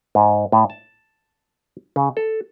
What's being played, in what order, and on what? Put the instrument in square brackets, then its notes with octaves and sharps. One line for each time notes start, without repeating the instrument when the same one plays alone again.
[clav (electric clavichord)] G#2
A2
A5
C#3
A4